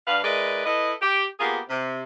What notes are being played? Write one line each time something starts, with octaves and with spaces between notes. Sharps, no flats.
G2 D4 B4 F5
G#3 E4 A#4 B4 D5
E4 A4 B4 D#5
G4
A#3 B3 F4 G4 G#4
C3